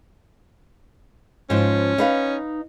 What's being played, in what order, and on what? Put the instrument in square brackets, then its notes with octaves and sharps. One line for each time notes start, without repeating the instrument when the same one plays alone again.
[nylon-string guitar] G#2 F3 [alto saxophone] C#4
[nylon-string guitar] D#4 B4 F5